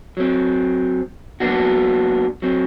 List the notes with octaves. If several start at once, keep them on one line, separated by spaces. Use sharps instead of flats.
F#3 C4
F#3 A#3 B3 D4 F#4
F#3 C4